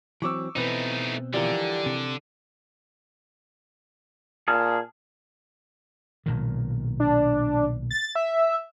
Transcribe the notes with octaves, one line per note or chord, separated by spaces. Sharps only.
E3 F#3 C4 C#6 D6 E6
B2 E3 A3 C4 D#4 B4
D3 E3 F3 G3 A#4
C3
A#2 G#4 A5 F6
B1 A#2 D#3
D4
A6
E5